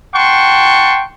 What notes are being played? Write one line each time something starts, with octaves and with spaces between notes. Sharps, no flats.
F#5 G5 A5 C6 C#6